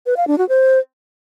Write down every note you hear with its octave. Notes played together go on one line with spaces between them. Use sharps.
B4
F5
D4
F#4
C5